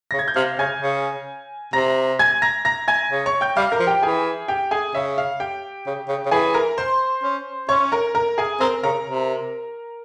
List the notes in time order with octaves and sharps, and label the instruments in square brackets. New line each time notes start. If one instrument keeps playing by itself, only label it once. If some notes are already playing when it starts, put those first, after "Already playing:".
[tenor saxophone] C#3 [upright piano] A#6
[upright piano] G#6
G6
[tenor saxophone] C3 [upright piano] F5 F6
[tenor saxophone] C#3 [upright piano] G#5 G#6
[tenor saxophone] C#3
[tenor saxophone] C3 [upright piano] A#5 A#6
[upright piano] G#5 G#6
A#5 A#6
A#5 A#6
G#5 G#6
[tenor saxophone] C#3
[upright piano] C#5 C#6
G5 G6
[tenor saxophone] G3 [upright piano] F5 F6
[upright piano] A#4 A#5
[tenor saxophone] F3
[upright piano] G4 G5
[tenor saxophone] E3 [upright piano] G#4 G#5
[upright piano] G4 G5
G#4 G#5
[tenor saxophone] C#3 [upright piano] E5
[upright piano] F5
G4 G5
[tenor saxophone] C#3
C#3
C#3
[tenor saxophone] E3 [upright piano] G#4 G#5
[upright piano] A#4 A#5
C5 C6
[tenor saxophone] C#4
[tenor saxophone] C#4 [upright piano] C#5 C#6
[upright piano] A#4 A#5
A#4 A#5
G#4 G#5
[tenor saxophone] C4 [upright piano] A#4 A#5
[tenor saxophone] C#3 [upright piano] A#4 A#5
[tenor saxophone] C3